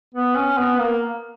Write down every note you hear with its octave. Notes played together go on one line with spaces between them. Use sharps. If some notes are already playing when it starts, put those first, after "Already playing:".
B3
C#4
B3
A#3